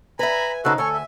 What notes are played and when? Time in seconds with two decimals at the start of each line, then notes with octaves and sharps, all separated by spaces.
0.19 B4 E5 G#5 A#5 B5
0.52 G#5
0.65 C#3 D#4 F#4 A4 B4 C5
0.78 D2 A4 C#5 G#5 C#6
0.93 E5